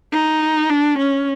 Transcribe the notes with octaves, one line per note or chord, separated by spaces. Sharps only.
D#4
D4
C#4